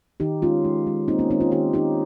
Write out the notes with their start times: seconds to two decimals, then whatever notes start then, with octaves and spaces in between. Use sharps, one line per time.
0.20 D#3 D#4 G4
0.42 G#3 C#4 F4
0.65 G#3
0.87 G#3
1.08 A#3 C4 D#4
1.19 A#3 C#4
1.30 D#3 C4 D#4
1.40 C#4 F4
1.51 D#3 D#4 G4
1.73 A#3 D#4 G4